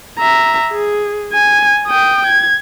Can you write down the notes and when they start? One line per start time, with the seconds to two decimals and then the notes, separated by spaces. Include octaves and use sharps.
0.19 E5 A#5
0.72 G#4
1.34 G#5
1.87 G5 D#6
2.27 G#6